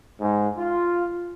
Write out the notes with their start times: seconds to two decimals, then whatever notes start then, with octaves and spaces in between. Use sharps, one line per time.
0.20 G#2
0.58 F4